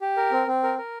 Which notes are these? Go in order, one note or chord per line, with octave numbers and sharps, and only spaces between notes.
G4
A#4
C4
C4
A#4
A#4